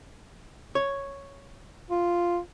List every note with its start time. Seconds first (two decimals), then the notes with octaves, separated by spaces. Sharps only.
0.75 C#5
1.91 F4